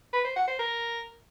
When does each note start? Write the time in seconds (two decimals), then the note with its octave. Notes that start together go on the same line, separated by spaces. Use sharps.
0.13 B4
0.25 C5
0.36 F#5
0.48 C5
0.59 A#4